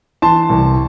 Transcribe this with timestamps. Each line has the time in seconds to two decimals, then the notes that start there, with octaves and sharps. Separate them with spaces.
0.22 E3 A5 C6
0.49 C2